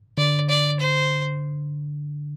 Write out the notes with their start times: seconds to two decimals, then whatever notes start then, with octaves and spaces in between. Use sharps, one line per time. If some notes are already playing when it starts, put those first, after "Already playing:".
0.18 D3 D5
0.49 D5
0.79 C5